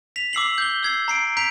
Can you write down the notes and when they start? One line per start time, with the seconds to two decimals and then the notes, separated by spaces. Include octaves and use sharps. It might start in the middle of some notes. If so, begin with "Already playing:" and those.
0.16 B6 F7
0.33 D6 E6 C7 F#7
0.58 G6 G7
0.83 E6 G#6 C7
1.08 A#5 C7 D7
1.37 A#5 G6 B6 D7 F7